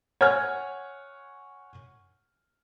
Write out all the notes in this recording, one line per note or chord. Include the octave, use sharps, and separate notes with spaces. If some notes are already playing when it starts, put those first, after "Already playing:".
C#5 F#5 G#5 F6 G#6